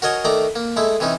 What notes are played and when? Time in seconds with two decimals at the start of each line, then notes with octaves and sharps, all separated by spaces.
0.02 F#4 A#4 C#5 D#5 G#5
0.24 D#3 A3 D5 A#5
0.55 A#3
0.76 G#3 A3 E4
1.00 C3 E3 C#4 D#4